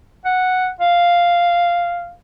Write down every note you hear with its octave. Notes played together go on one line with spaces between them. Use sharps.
F#5
F5